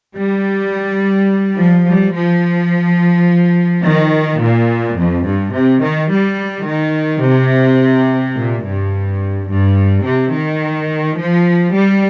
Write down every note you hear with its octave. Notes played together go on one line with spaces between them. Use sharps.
G3
F3
G3
F3
D#3
A#2
F2
G2
C3
D#3
G3
D#3
C3
A#2
G2
G2
C3
D#3
F3
G3